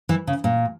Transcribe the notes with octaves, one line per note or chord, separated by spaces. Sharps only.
E3
C#3
A#2